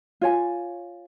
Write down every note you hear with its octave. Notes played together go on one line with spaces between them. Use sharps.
F4 C#5 G#5